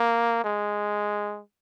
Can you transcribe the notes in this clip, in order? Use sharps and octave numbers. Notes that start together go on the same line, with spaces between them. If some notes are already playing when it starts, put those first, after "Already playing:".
Already playing: A#3
G#3